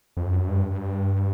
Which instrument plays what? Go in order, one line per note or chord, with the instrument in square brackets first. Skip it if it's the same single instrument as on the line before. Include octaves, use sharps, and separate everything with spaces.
[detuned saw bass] F2
F#2
G2
G2